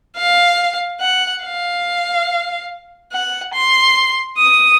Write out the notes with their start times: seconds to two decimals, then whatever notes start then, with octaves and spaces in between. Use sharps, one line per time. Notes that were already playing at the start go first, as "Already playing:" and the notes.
0.17 F5
1.01 F#5
1.43 F5
3.12 F#5
3.54 C6
4.38 D#6